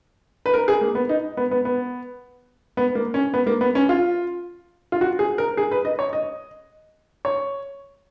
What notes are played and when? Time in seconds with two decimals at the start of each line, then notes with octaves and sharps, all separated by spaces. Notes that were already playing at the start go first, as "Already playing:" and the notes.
0.46 B4
0.54 A#4
0.68 G#4
0.81 A#3
0.95 B3
1.09 D#4
1.37 B3
1.51 B3
1.65 B3
2.77 B3
2.95 A#3
3.14 C#4
3.34 B3
3.47 A#3
3.61 B3
3.75 C#4
3.89 F4
4.92 F4
5.01 F#4
5.19 G#4
5.38 A#4
5.57 G#4
5.71 B4
5.85 D#5
5.99 C#5
6.13 D#5
7.25 C#5